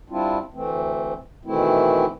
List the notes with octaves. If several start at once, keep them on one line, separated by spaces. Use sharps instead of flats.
G3 C4 D4 E4 F4
D2 E3 A3 C4
B2 D#3 E3 A3 C4 E4